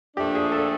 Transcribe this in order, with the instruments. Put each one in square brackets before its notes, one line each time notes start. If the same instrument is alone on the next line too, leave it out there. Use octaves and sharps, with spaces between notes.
[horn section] A#2 F3 A3 D4 [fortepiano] G4
[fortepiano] G#4
A4